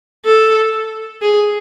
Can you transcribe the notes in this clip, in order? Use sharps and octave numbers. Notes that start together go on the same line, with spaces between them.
A4
G#4